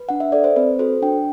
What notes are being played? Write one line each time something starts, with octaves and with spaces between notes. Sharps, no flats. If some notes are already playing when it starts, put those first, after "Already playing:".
Already playing: B4
D4 F#5
E5
A4 D5
C5
C4 B4
F#4 A4 C5
D4 G5